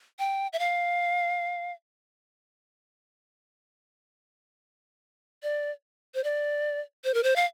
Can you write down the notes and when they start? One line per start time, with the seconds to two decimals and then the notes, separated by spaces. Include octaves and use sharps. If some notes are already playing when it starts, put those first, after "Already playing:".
0.19 G5
0.53 E5
0.59 F5
5.43 D5
6.14 C5
6.24 D5
7.04 C5
7.14 A#4
7.23 C5
7.36 F5